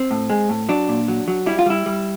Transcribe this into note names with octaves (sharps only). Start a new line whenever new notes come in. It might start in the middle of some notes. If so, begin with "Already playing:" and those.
Already playing: C4
A2
G#3
A2
F#3 D4
A#2
F#3
F#3
G3 E4
F4
G3 E4
G3